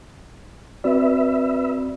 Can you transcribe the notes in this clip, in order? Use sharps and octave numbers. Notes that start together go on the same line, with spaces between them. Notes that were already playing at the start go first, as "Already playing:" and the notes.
C4 F#4 B4 D5 E5